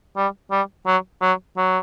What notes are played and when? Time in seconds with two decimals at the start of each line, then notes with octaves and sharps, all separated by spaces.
0.17 G3
0.51 G3
0.86 F#3
1.22 F#3
1.57 F#3